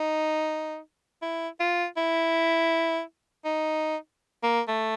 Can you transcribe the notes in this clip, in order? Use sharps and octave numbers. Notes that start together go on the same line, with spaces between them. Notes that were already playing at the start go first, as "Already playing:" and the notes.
Already playing: D#4
E4
F4
E4
D#4
A#3
A3